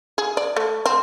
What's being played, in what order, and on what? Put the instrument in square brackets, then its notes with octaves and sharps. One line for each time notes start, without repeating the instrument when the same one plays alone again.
[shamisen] G#4
D5
A3
C4